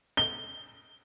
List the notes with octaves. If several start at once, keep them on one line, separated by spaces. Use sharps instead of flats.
G7